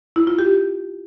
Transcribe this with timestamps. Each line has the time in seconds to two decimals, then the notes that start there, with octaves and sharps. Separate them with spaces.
0.16 E4
0.27 F4
0.39 G4